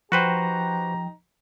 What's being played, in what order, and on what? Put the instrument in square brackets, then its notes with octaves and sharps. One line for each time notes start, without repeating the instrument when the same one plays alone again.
[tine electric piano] F3 G5 [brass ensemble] D#4 G4 A#5 [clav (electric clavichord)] F#4 B4 C5